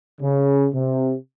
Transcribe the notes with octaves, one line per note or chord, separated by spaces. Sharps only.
C#3
C3